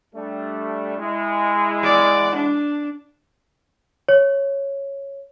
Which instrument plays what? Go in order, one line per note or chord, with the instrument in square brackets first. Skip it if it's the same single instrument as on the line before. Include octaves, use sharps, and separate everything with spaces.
[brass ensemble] G3 A3 D4
G#3 E4
[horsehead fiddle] D5 F#5
D4
[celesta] C#5